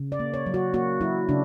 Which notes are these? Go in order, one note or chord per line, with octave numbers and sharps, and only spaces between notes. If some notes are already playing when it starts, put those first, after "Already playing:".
Already playing: C#3
D5
A#3
C#5
F#3
F#4
A#3 F#4
F#3 E4
C#3 D4